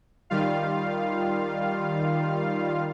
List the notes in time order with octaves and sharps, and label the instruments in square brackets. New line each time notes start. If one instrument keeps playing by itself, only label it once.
[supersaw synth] D#3 G3 F4 F5